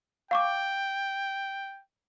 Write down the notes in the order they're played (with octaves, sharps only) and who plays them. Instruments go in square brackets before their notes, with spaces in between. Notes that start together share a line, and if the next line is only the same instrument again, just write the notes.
[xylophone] F5 C#6 D6 [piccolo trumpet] G5